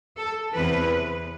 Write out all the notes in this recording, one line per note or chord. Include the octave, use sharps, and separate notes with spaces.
A4
E2 C3 E3 B4